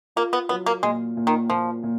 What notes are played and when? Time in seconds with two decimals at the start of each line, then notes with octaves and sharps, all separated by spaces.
0.16 A#3 F4
0.33 B3
0.49 F#3 B3
0.66 A#3
0.83 A#2 G#3
1.17 A#2
1.27 D#3
1.50 A#2 F3
1.83 A#2